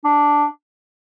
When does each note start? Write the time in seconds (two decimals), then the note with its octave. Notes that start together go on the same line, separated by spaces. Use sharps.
0.04 D4